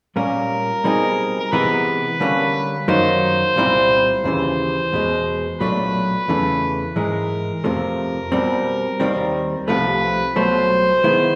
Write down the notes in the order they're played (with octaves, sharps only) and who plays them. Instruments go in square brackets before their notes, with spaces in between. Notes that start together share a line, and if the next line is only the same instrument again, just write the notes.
[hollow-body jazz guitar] A#2 G3 A#3 C#4 [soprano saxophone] A#4
[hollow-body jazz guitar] B2 G3 C4 D#4 G#4
[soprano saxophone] A#4
[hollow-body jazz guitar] C3 E3 G#3 B3 [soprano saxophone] B4
[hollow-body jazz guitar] D3 G3 A#3 C#4
[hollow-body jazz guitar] F#2 D#3 F#3 A#3 D#4 [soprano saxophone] C5
[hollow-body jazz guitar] C2 A#2 G3 C4 E4
[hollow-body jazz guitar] D#2 C#3 E3 [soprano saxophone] C5
[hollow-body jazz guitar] E2 B2 G#3
[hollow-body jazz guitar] B1 A#2 F#3 A3 D4 [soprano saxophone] B4
[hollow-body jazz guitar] E2 C#3 E3 A3
[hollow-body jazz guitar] G#2 E3 G#3 [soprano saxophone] A#4
[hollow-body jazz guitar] F2 C3 F3 A3
B2 G3 C4
D#2 D#3 G3 C4
[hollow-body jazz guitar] C2 C3 F3 A3 [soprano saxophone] B4
[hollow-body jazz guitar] C2 B2 F#3 A3 [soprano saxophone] C5
[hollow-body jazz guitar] D#3 G#3 B3 E4